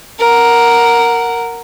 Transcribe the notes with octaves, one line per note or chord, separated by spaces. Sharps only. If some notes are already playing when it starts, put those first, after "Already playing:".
A#4 F#5